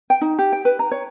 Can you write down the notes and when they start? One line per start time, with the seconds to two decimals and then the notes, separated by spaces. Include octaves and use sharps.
0.10 G5
0.21 D#4
0.39 G4
0.53 G5
0.65 B4
0.79 A#5
0.91 C#5